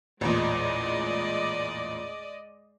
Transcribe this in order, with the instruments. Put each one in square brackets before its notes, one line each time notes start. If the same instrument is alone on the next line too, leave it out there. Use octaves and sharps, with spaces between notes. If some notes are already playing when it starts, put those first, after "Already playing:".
[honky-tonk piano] A1 E2 A#2 [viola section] G#3 D5 D#5